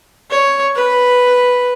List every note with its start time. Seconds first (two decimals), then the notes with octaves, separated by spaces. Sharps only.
0.31 C#5
0.75 B4